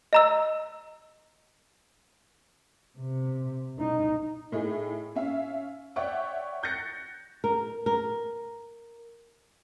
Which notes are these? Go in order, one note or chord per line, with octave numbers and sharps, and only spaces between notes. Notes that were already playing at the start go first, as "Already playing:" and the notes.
D#5 A#5 E6
C3
D#4
A2 D#4 E4 G#4
C#4 E5 F5
C#5 D5 E5 F#5 G5 C#6
F#6 G6 A6 A#6 C#7
A#4
A#4